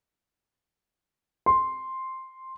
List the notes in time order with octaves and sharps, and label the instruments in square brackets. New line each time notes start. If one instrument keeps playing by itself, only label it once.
[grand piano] C6